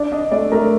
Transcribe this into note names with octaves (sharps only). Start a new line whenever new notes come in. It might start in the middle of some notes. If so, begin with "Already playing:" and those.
Already playing: D4 D5
D4 D#5
A3 D5
A3 A#4